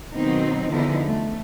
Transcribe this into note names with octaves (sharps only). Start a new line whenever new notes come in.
B2 D#3 F#3 C4 D#4
E2 D3 F3 D#4 E4
A3